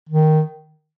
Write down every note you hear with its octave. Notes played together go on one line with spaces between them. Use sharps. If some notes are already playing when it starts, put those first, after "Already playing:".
D#3